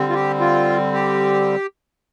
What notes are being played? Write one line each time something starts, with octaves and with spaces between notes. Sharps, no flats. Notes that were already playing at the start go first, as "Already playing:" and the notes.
Already playing: D3 G3 C4
F4
G4
F4
G4